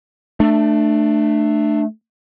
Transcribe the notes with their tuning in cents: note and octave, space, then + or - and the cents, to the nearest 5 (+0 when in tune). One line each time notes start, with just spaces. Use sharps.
A3 +0 D4 +25